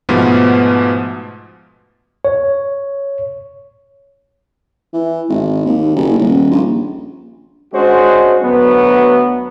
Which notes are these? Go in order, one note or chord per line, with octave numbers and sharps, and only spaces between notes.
G#2 B2 F3 G#3 A3 B3
C#5
E3
G#1
D#2
F#1
D#1
A#1
G#3 C#4 D4 F#4 C5
D2 F#3 B3